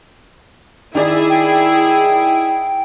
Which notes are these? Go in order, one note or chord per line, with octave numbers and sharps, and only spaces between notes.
D#3 E4 G#4 D5
G5